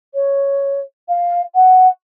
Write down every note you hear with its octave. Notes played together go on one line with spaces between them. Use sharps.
C#5
F5
F#5